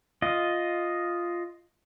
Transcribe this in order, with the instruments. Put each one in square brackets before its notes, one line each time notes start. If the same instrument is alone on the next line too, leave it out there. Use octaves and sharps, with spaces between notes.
[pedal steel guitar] F4 D#5